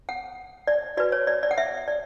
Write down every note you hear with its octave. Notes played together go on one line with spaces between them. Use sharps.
F#5
D5
F#4 B4 D5
C#5
D5
D5
F#5
E5
D5